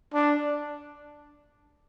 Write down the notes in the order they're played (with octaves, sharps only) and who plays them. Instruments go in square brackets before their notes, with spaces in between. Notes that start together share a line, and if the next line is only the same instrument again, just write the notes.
[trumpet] D4